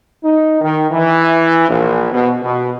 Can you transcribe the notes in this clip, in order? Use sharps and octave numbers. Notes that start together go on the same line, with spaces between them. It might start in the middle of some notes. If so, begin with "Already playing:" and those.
D#4
D#3
E3
A#1
B2
B2